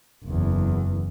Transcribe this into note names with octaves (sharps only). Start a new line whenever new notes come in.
F#1 E2